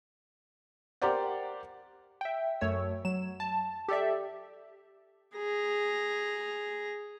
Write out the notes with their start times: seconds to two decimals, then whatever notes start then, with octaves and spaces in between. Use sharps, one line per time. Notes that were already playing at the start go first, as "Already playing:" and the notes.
1.02 G4 A#4 C5 D5 F#5
2.21 E5 G5
2.61 F#2 A3 C#5 E6
3.05 F#3 E7
3.40 A5
3.88 G4 A4 D5 E5
5.36 G#4 A#5